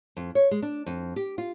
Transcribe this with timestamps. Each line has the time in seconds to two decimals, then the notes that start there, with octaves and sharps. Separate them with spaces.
0.17 F2
0.35 C#5
0.51 G#3
0.62 D4
0.86 F2
1.16 G4
1.38 F4